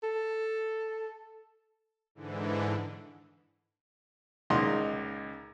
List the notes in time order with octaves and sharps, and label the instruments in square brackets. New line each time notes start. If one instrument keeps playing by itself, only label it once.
[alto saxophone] A4
[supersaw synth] G#2 D3 E3
[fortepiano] C#2 A#2 A#3 D#4 F#5 C6